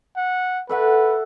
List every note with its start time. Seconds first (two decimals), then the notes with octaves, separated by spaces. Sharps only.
0.17 F#5
0.69 A4 B4 E5 F#5